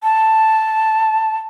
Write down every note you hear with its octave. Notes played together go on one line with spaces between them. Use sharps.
A5